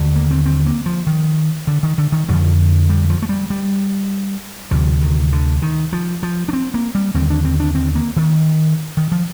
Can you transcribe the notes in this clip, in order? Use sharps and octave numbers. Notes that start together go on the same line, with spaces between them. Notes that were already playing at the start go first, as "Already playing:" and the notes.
Already playing: D#2 D3
A#3
C4
C4
A#3
F3
D#3
D3
D#3
D3
D#3
F2 D3 F3
G3
F3
A3
G3
G3
D2 C3 F3
D#3
D3
D#3
F3
F3
D4
C4
A#3
G3
D#2 D3 C4
D4
C4
D4
C4
A#3
D#3
D#3
F3